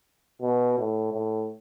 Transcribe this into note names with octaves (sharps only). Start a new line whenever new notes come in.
B2
A2
A2